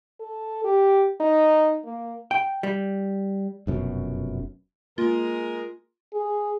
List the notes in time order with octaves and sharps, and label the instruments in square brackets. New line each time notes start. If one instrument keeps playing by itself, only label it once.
[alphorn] A4
G4
D#4
A#3
[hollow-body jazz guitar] G5
G3
[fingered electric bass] F1 F#2 B2
[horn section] G#3 A#4 [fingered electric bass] A#3 [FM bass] F4
[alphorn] G#4